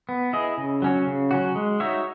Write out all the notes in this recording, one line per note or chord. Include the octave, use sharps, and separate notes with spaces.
B3
E4 G#4 D#5
C#3
F#3 C#4 F#4
C#3
F#3 C#4 F#4
G#3
D#4 F#4 C#5 E5